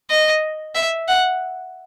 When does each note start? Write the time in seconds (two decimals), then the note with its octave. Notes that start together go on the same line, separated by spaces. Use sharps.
0.10 D#5
0.75 E5
1.08 F#5